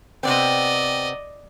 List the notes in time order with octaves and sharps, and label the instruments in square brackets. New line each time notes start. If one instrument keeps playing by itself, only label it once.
[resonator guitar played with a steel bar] C3 B3 C4 [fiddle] D5 D#5